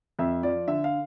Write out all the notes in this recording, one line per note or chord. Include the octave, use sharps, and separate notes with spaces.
F2 E5
F3 D5
D3 E5
F5